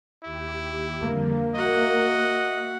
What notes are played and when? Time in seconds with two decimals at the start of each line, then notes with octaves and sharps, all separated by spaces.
0.23 D#2 E4 G4
1.01 F2 D3 G3 A#3
1.54 F#4 D#5 E5 F#5